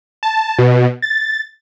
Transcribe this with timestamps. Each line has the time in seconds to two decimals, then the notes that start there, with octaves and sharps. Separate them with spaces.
0.23 A5
0.58 B2
1.02 A6